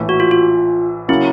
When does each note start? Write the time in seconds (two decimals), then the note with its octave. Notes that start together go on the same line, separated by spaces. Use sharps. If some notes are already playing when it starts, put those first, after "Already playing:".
Already playing: A#1 A2 E3
0.09 F#4
0.20 F4
0.31 F4
1.08 C#3 F#3 A#3 C#4 E4